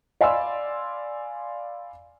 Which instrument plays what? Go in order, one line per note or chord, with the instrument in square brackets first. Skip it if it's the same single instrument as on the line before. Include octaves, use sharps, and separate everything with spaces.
[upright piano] D5 F5 G#5 B5 C6 E6